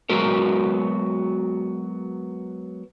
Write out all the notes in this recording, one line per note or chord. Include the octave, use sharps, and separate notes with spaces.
F#3 G#3 B3 F#4 A#4